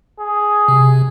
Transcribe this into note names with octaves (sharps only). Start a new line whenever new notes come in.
G#4
C3